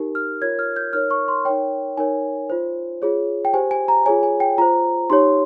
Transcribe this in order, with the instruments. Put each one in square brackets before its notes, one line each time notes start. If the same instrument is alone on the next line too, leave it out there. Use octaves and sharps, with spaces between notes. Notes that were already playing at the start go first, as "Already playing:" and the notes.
Already playing: [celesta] D#4 G4 A#4
F6
F4 A#4 C#5 G#6
F6
G6
D#4 A#4 C#5 F6
C#6
C6
D#4 A#4 C#5 G5
D#4 A#4 C#5 G#5
F4 C5
F4 G#4 C#5
G5
G4 C5 G#5
G#5
A#5
F4 G#4 C#5 G#5
G#5
G5
F4 C5 A#5
D#4 G4 C#5 C6